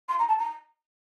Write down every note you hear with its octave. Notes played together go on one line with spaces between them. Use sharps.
C6
A#5
A5
A#5